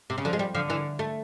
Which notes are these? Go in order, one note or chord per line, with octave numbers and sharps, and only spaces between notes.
C3
C#3
D3 F3
G#3
G3
D3 F3
E3
A3